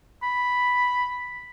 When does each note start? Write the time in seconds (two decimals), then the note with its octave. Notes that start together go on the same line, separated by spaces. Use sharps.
0.23 B5